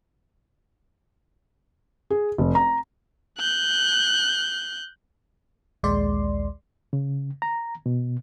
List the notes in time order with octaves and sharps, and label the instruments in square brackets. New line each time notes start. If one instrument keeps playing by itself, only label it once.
[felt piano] G#4
F1
A#5
[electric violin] F#6 G6
[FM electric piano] A#1 D#2 G#3 D5 C6
[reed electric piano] C#3
A#5
B2